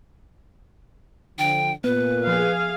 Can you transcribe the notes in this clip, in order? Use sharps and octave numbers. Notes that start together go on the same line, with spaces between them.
D3 F3 G5
A#2 B3 B4
F3 G#4 F5